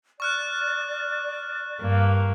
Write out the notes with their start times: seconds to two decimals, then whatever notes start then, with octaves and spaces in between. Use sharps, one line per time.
0.20 D5 C#6 F6 F#6
1.80 G2 A#3